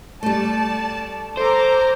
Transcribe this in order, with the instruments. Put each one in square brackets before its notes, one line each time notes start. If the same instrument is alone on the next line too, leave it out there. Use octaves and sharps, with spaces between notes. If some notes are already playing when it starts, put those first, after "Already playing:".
[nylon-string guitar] G3 A3 [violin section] D5 A5
[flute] A4 [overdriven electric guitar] C5 [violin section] A#5 D6